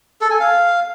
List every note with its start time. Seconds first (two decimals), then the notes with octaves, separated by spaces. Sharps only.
0.21 A4
0.31 G#5
0.40 F5